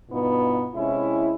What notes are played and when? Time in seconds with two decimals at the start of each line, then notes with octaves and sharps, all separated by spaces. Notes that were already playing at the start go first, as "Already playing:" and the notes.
0.10 G2 B2 B3 D#4 F4
0.74 C3 G#3 C#4 E4